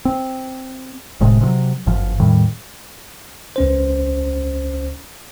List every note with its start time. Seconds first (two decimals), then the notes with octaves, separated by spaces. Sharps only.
0.05 C4
1.20 F1 A2 C3 G#3
1.41 C3 D#3 F#3
1.86 G1 F#2 F3
2.19 E2 A2 D#3 G3
3.56 C#2 C#4 C5